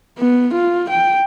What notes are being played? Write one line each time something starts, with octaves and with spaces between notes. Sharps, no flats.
B3
F4
G5